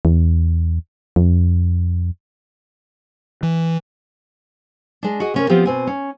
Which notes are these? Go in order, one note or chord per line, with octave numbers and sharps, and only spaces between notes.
E2
F2
E3
G#3 D4
F#4 G#4 D#5
C3 C#4 A#4
F3 B3 C4 F4 G4
B2 C4 G#5
C#4